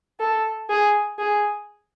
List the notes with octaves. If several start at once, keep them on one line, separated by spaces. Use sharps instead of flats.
A4
G#4
G#4